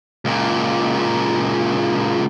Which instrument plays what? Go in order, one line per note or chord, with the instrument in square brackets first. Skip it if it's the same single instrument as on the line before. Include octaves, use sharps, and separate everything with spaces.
[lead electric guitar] C#2 A#2